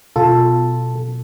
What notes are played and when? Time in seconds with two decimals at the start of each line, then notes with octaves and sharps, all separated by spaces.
0.16 B2 F4 A4